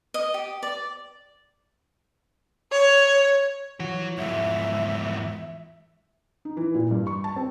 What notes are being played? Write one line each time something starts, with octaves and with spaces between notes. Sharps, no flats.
D#5
G4
D5
C#5
E3 F3 F#4 C#5
E2 G#2 E5
D#4
E3
A#2
G2
C#6
A5
C4